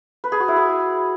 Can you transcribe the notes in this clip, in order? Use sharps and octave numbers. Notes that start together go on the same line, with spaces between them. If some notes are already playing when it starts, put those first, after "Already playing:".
B4
G#4
F#4
E4
G#4